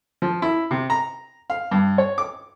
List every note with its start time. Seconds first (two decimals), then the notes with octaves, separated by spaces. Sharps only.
0.22 F3
0.42 E4
0.71 C3
0.90 A#5
1.50 F5
1.71 G2
1.98 C#5
2.18 D6